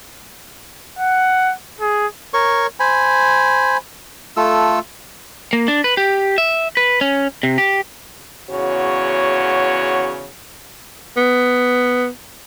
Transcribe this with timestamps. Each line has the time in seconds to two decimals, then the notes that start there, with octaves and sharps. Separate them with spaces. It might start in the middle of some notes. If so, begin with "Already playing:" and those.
0.99 F#5
1.80 G#4
2.34 A#4 C#5 C#6
2.80 C5 G#5 B5
4.37 A3 F4 A4 E6
5.53 A#3
5.68 D4
5.84 B4
5.97 G4
6.38 E5
6.77 B4
7.01 C#4
7.43 C3
7.58 G4
8.50 E2 C#3 F#4 C#5
11.17 B3